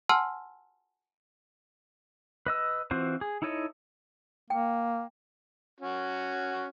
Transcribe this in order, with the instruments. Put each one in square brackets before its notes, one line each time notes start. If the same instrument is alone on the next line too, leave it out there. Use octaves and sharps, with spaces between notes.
[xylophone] F#5 G#5 A5 C6 E6 F6
[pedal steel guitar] B4 D#5 E6
E3 C4 F4 F#4 C5
G#4
D#4 E4 A4 C#5 D#5
[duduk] A#3 [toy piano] G5
[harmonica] C#4 F#4